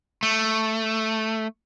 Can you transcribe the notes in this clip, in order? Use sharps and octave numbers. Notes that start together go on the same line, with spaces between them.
A3